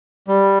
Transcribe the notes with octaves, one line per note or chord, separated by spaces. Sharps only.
G3